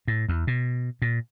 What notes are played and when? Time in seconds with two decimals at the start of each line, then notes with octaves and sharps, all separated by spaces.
0.08 A2
0.29 E2
0.47 B2
1.02 A#2